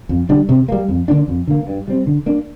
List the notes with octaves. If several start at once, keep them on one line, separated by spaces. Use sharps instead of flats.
F2
D3 G3 D4
C3
G3 A#3
F2
D3 A#3 D4
F2
D3 A#3
G2
G3 C4
D3
A#3 D4